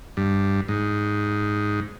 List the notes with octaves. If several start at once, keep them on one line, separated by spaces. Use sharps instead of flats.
G2
G#2